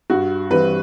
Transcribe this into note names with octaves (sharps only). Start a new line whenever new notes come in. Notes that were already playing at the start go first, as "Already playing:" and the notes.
G2 F#4
E3 G3 C4 B4